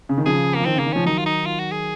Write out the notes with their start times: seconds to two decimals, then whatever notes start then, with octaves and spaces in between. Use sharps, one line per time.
0.09 C#3
0.18 D#3
0.26 C#3 F3 G#4
0.55 A#3
0.60 F3
0.66 D#3 C4
0.76 C#3
0.79 A#3
0.86 D#3
0.93 C#3 F3 C#4
1.06 D#3 F#3 D#4
1.18 F4
1.26 D#4
1.46 F4
1.59 F#4
1.72 G#4